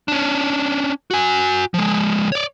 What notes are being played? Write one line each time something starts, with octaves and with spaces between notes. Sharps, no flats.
C#4 D4
F#4 G#5
F3 G#3
C#5 D5